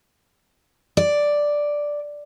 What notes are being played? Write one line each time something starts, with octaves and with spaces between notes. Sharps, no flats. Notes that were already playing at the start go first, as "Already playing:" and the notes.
D5